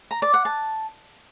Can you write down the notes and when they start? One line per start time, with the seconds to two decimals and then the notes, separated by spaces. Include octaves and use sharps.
0.11 A#5
0.22 D5
0.34 F#5
0.45 A5